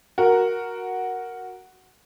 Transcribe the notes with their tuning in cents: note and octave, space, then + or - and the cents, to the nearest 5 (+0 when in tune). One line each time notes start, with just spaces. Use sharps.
F#4 +0 A#4 +0